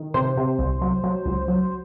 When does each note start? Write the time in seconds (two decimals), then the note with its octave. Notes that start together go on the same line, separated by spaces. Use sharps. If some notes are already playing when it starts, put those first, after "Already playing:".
Already playing: D#3
0.14 C3 C5
0.37 C3
0.59 C2
0.81 F#3
1.04 F#3
1.26 C#2
1.48 F#3